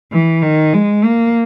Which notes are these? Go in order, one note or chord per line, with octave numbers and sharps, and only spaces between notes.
E3
D#3
G#3
A#3